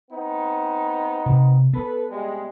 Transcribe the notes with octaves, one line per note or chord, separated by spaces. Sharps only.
B3 C4 D#4
C3
B3 A4 B4
C3 G3 G#3